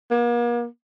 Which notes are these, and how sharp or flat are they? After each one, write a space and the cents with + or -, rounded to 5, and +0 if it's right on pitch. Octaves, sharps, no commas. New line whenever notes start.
A#3 +40